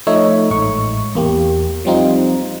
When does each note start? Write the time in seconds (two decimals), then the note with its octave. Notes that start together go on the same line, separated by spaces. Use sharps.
0.07 F3 A3 D#4 C#5 E5
0.50 A1 G#2 C#6
1.15 E2 A#3 G4
1.85 F3 G3 C4 D#4 F4